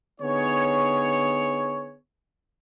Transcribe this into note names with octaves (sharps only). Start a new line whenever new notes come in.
D3 B3 D#4 G#4 C#5